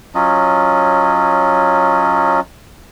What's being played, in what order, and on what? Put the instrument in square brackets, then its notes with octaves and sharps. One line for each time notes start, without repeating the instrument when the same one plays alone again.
[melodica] F#3 C#4 F4 D#5